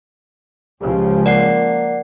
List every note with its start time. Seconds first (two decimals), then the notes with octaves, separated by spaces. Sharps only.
0.82 C#2 C#3 F3 G4
1.26 A#3 D5 F#5 C7